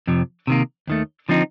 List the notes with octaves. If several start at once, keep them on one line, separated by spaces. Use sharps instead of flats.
F2 C3 F3
C3 D#3 A#3
D#2 D#3 A3
D3 F3 C4 D#4